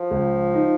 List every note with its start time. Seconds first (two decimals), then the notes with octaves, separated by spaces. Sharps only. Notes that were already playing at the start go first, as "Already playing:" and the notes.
Already playing: F3
0.11 C#2
0.54 D#4